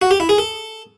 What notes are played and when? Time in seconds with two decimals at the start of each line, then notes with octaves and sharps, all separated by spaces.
0.02 F#4
0.11 G4
0.20 E4
0.29 G#4
0.38 A4